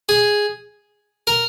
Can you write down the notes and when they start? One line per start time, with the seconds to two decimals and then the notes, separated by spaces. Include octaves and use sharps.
0.09 G#4
1.27 A#4